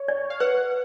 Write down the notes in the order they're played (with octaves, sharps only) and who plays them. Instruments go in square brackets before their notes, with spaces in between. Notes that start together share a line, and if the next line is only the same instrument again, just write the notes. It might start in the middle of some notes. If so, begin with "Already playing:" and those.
Already playing: [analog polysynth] C#5
[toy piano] D5
[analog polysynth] F5
[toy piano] B4 [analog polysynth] F#5